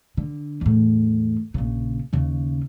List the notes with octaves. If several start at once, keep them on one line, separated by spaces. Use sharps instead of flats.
D3
E2 A2
A#1 C#3
D#2 C#3